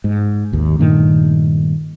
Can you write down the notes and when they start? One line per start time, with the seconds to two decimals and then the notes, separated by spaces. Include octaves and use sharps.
0.04 G#2
0.52 G#1 D#2
0.79 G2 A#2 D#3 A3